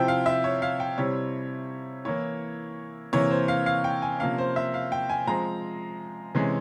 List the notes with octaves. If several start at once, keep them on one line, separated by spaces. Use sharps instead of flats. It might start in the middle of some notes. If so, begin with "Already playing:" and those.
Already playing: C3 F3 C4 E4 G5
F5
E5
C#5
F5
G5
C3 G3 C4 E4 C#5
E3 A#3 E4 C#5
C3 E3 A#3 C#5
C5
F5
F5
G5
G#5
C3 F3 A#3 C#4 F5
C5
E5
F5
G5
G#5
F3 G#3 C4 A#5
C3 E3 G#3 C#4